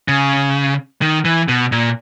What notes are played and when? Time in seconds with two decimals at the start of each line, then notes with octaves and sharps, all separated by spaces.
0.08 C#3
1.02 D#3
1.25 E3
1.48 B2
1.72 A#2